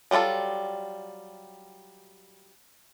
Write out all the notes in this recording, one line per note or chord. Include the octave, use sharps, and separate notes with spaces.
F#3 G3 D4 F4 A4